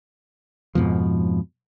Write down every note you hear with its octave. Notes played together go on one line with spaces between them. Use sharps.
F2 G#2 B2 F3